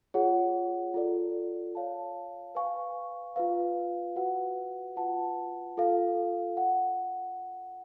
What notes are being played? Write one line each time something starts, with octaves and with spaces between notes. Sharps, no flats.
F4 G#4 C#5 F#5
F4 A4 D5
C#5 F5 A5
B4 F5 G#5 C#6
F4 B4 F5
F#4 B4 F#5
F4 B4 F#5 A5
F4 A4 F5
F#5